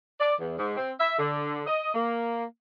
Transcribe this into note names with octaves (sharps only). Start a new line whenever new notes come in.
D5
E2
G#2
C4
E5
D3
D#5
A#3